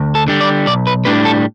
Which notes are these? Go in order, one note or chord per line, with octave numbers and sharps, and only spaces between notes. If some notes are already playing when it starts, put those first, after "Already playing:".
Already playing: D2
A4
D3 G3
D5
B1 D5
B4
A2 G3 D4 B4
A4